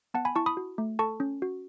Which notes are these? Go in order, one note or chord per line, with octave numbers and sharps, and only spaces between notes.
B3 F#5 A5
G#5 B5
E4 A5 C#6
B5 D#6
F#4
A3
A4 A5 C#6
C#4
F#4